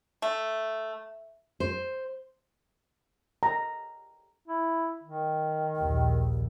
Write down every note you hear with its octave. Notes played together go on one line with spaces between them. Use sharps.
A3
C5
A#5
E4
D#3
A#1 D#2